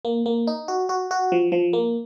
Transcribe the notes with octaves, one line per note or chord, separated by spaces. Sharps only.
A#3
A#3
D#4
F#4
F#4
F#4
F3
F3
A#3